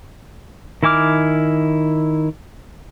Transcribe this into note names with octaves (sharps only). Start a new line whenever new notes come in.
D#3 E4 G#5 D6 F6